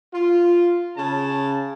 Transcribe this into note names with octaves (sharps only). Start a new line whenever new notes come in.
F4
C#3 A5